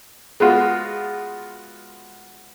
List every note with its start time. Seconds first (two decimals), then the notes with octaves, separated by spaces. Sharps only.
0.40 G#3 B3 F4 F#4